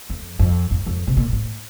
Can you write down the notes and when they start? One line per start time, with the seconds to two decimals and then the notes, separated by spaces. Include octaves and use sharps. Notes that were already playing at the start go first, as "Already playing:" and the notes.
0.10 F2
0.39 F2
0.71 F2
0.86 F2
1.07 C3
1.17 A#2
1.32 A2